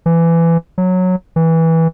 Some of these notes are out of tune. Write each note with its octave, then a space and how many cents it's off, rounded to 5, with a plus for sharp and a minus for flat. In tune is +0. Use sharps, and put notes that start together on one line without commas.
E3 +20
F#3 -10
E3 -15